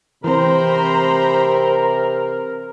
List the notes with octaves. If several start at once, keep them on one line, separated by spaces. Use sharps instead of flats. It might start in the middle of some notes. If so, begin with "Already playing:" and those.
C3 E3 C4 A#4 C5 A#5 B5